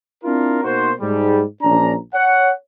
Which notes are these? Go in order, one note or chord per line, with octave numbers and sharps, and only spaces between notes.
C4 D4 E4 F4 A#4
B2 A#3 D#4 F#4 C5
G#2 G3
A#1 C#4 D4 A#5
C#5 F#5